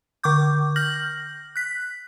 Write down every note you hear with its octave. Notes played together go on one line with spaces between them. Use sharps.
D3 C#6 D6 G6
F6 G6 A#6 F#7
F#6 B6